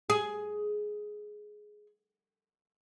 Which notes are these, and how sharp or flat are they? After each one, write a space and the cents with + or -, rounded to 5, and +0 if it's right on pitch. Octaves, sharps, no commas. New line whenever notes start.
G#4 +10